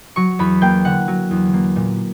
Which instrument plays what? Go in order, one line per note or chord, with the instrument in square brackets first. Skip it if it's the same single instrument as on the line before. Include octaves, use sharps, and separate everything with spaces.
[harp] F#3 C#6
E2 B5
A#3 G5
D3 F#5
F#3
E2
A#3
A#2